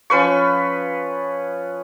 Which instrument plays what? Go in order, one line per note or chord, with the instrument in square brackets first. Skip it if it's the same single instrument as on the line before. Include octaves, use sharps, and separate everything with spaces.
[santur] F3 C#4 B4 C#6